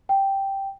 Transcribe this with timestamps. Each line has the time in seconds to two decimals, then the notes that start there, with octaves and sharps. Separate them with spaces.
0.09 G5